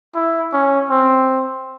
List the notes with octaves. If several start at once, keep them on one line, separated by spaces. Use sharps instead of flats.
E4
C#4
C4